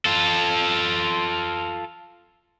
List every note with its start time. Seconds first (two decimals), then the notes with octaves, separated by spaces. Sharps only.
0.05 F4 A4